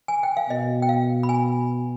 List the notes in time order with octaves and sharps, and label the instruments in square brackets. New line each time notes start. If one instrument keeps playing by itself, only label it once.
[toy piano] G#5
G5
F5
[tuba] B2 [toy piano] D#5
[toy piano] G5
F5
B5
G#5